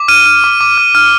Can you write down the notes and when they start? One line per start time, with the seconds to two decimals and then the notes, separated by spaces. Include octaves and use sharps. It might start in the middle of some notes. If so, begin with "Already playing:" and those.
Already playing: D6
0.08 F6 D#7
0.26 F6
0.44 D6
0.61 D6
0.78 F6
0.95 F6